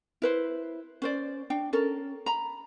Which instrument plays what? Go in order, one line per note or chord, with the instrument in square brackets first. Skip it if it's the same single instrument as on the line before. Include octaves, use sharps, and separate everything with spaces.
[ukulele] E4 B4 C5
C#4 C5 D5
D4 G5
C#4 A4 A#4
A#5 B5